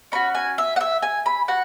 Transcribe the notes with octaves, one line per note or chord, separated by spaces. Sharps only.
C#4 F#4 B5
G#5
E5
F#5
E5
G#5
B5
F#4 F#5